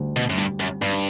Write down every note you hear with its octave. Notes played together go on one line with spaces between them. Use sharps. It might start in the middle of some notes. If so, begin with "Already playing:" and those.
Already playing: D2 G3
B2
F#2
G2 G3
F#2
G2 G3